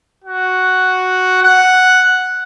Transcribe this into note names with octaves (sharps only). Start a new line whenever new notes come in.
F#4
F#5